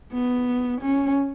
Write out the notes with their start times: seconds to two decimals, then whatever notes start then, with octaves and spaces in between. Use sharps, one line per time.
0.13 B3
0.81 C#4